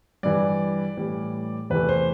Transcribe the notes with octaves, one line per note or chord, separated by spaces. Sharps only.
G2 E3 G3 D5
A2 E3 G3
E2 C3 E3 A3 B4
C5